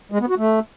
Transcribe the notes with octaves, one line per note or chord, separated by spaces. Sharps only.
G#3
B3
F#4
A3